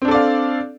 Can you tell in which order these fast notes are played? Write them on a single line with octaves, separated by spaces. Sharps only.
C4 D4 A4 D5 F5